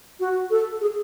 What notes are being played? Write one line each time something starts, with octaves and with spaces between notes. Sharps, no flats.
F#4
A4
G#4